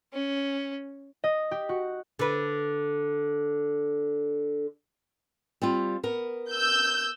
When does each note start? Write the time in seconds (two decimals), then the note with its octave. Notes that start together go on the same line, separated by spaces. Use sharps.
0.13 C#4
1.24 D#5
1.51 G4
1.69 F#4
2.19 D3 B4
5.62 G3 C4 F4
6.03 B3 A#4
6.49 E6 G6